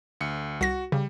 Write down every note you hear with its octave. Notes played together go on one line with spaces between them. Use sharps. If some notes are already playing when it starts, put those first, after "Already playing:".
D2 C#7
C2 F#4 A#6
C#3 G3